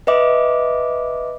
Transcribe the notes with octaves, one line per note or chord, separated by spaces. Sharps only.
B4 D#5 E5 D6